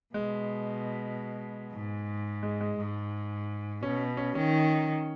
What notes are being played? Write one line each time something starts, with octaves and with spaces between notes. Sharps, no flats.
B2 G#3
G#2
G#3
G#3
G#2
B2 C#4
C#4
D#3 C#4